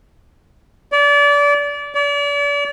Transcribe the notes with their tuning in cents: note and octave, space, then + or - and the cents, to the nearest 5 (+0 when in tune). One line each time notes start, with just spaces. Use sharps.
D5 -30
D5 -40